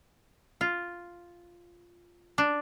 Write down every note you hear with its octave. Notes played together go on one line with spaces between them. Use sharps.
F4
D4